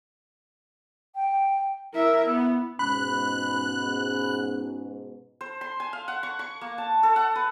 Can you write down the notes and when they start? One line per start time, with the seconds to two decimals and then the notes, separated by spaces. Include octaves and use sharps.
1.15 G5
1.94 E4 A#4 E5
2.26 B3
2.79 G#2 B2 C#4 B5 F#6
5.41 C5
5.61 C6
5.80 G#5
5.93 F5
6.08 F#5
6.23 C#6
6.39 C#6
6.61 A#3
6.78 A5
7.03 A4
7.16 F#5
7.35 B4